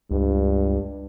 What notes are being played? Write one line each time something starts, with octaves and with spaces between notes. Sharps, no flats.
C#2 G2